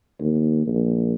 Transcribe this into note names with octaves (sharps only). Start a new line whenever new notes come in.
D#2
A#1